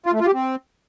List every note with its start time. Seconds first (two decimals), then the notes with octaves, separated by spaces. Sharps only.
0.06 F4
0.13 A3
0.20 F4
0.27 G4
0.34 C4